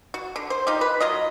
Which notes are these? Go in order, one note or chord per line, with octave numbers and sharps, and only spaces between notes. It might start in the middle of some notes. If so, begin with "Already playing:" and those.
F#4
D3
C5
D#4 F4 G4
B4
F#3 F4 D#5